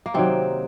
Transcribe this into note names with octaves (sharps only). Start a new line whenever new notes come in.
A#3
C3 D#3 F#3 C4